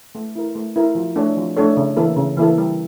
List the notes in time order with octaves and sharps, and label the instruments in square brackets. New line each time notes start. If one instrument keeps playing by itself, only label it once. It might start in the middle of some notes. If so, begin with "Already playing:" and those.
[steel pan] A3
E4 A#4
A3
E4 A#4
F3
A3 D4 A4 C#5
F3
A3 D4 A4 C#5
C#3
E3 A#3 E4 A4
C#3
E3 A#3 E4 A4
G3